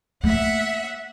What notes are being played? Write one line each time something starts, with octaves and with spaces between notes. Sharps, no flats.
A3 A#3 E5 F#5